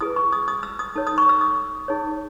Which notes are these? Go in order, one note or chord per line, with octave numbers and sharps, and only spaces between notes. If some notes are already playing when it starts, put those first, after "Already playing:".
E4 G#4 B4 D#6
C#6
D#6
D#6
E6
D#6
D#4 A4 C#5
D#6
C#6
E6
D#6
D#4 G#4 C#5